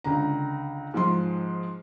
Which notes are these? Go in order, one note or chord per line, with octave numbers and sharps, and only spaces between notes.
C#2 D3 A#5
G#2 F3 C6